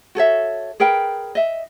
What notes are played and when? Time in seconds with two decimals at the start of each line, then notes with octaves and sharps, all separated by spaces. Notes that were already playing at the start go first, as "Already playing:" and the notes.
0.15 F#4 A4 C#5 E5
0.80 G#4 A#4 B4 G5
1.35 D#5 E5